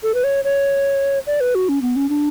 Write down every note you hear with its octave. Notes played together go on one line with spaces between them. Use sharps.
A4
B4
C#5
C#5
D5
B4
F#4
C#4
B3
C#4
D4